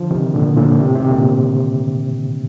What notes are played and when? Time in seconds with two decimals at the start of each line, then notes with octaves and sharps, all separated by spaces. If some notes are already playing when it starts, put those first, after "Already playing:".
Already playing: D3 F3
0.11 C3 D#3
0.33 A#2 D3
0.57 A#2 D3
0.80 A2 C3
0.95 C3 D#3
1.10 A#2 D3